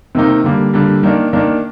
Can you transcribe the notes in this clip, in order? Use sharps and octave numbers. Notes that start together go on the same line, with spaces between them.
C3 D#3 A#3 D#4
D3 G3 A#3
D3 G3 A#3
D#3 A#3 D4
D#3 A#3 D4